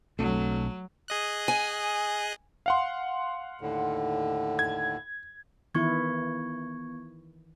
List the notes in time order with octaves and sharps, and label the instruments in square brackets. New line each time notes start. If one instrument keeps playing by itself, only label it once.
[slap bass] B1 C4 D4 [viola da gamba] F#3 [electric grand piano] A3
[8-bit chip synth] G#4 D#5 F#6
[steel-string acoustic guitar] G#5
[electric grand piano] F5 F#5 C6
[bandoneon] D#2 A2 D3
[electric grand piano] G#6
[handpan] D#3 E3 E4 [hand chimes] B3 C#6 G#6